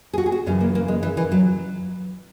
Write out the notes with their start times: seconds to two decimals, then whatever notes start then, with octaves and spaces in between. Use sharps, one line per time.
0.13 G#4
0.18 F#4
0.26 G#4
0.32 F#4
0.46 F#2 C#3 E3 C#4
0.61 A#3
0.75 A#3
0.88 G#3
1.03 E3
1.17 E3
1.32 F#3